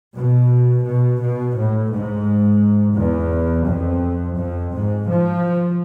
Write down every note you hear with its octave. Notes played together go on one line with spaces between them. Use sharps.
B2
B2
B2
A2
G#2
E2
F2
F2
G#2
F3